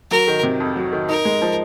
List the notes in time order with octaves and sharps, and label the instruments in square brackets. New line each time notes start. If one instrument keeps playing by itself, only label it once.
[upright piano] F#3 [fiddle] A#4
[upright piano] D#3
C3
F2
F#3
D#3
[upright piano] D#4 [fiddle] A#4
[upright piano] G#3
F3